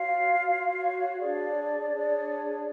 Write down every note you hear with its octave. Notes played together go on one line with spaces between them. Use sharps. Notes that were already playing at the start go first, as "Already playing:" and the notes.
Already playing: F4 F#4 C#5 F5
F#4 C#5
D4 G#4 C#5 D5
D4 G#4 C#5